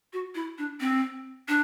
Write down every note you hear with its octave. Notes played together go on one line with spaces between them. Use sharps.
F#4
E4
D4
C4
D4